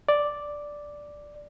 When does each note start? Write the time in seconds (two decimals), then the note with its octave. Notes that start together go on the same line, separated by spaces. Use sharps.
0.09 D5